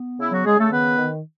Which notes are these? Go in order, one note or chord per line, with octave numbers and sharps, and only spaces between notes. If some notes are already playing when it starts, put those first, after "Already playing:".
Already playing: B3
C#3 E4
F#3 F#4
C#3 G#3 G#4
A3 A4
D#3 B3 B4
D#3